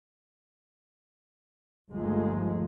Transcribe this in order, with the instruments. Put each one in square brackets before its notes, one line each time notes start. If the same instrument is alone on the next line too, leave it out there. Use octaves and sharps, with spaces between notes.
[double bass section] G1 D#2 F3 G#3 A3